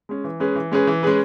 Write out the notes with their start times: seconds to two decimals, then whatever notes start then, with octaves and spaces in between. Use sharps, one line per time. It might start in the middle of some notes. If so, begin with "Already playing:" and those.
0.09 G#3 C#4
0.24 E3
0.40 G#3 C#4 G#4 B4
0.56 E3
0.71 G#3 C#4 G#4 B4
0.87 E3
1.03 G#3 C#4 G#4 B4